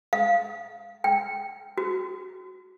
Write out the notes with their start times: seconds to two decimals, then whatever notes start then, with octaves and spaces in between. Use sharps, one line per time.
0.13 F5
1.04 G5
1.78 F#4